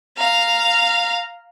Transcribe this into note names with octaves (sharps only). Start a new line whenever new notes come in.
F5 A#5